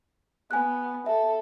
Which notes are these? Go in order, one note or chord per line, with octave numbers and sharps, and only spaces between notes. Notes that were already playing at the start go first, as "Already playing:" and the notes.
B3 G#5 F#6
A4 E5